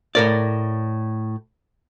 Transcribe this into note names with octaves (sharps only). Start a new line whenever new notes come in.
A2 A#4 D5